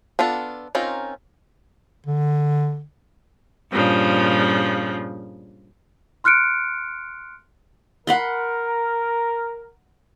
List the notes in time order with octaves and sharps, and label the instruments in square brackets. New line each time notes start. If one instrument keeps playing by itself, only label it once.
[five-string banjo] B3 D4 F4 A4
C4 C#4 D#4 F4 A#4
[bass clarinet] D3
[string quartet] G2 A#2 C#3 F3
[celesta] C6 F6 F#6 C#7 D7
[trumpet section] A#4 [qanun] F#5 B5 C6